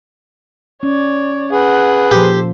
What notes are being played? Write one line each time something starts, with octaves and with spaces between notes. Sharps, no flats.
C#4 C#5 D5
G#4 B4 F#5
A#2 F3 G4 A4 C5